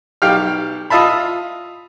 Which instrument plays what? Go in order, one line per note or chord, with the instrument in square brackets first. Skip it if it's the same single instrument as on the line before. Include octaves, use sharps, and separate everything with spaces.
[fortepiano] B1 G4 F5 G5 F6
F4 D#5 E5 A5 B5